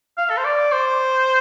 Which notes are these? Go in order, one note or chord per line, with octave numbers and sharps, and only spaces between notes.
F5
A4
C5
D5
C5